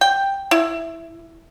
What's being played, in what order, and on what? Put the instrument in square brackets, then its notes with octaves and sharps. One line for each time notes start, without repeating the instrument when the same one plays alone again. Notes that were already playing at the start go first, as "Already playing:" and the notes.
[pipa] G5
E4